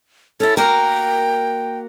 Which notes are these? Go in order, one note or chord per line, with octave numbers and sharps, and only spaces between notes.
C#4 E4 A4
A#3 F#4 A#4 G5